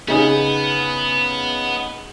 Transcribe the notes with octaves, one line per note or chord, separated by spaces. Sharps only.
C#3 B3 D#4 G#4